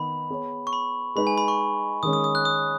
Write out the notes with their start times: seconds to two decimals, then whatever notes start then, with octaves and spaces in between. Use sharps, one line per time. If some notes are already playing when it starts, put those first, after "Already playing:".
Already playing: D#3 B3 D#4 B5
0.30 B3 G#4 C#5
0.67 C#6
0.73 B5
1.15 G#3 D#4 B4 D#5 B5
1.27 G#5
1.38 B5
1.48 C#6
2.03 D#3 G#3 C#4 D#6
2.13 D#6
2.24 D#6
2.35 F#6
2.45 D#6